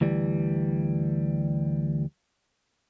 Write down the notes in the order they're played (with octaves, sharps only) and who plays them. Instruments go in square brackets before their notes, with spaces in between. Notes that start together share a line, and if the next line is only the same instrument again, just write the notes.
[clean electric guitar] D2 E3 G3